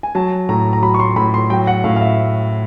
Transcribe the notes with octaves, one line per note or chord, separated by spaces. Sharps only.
G#5
F#3 A5
A2 A#5
A#5
F#3 B5
C#6
C6
A2 B5
C6
F#3 G5
F#5
A2 F5
F5
E5